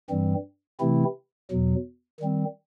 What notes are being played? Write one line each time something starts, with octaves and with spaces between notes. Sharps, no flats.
G2 E3 G3 C4
C3 E3 A3 C4 E4
E2 B2 F#3
D#3 G3 C4